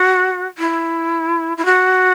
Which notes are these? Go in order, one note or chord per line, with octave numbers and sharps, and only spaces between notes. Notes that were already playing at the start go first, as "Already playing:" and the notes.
Already playing: F#4
E4
E4
F#4